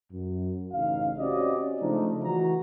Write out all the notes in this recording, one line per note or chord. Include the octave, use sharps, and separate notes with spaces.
F#2
A1 C#3 D#4 F5
C4 C#4 F#4 G4 D5 D#5
C#3 F3 G#3 A3 D4 D#4
E3 F#4 A#5